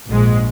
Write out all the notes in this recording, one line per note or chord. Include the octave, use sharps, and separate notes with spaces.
A#1 G#2 G#3